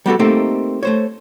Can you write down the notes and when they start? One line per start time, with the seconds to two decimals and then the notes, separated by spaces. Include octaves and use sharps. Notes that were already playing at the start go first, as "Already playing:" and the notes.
0.06 G3 B3 F#4 A4
0.19 A3 A#3 C4 D#4 G4 A4
0.83 A3 C5 C#5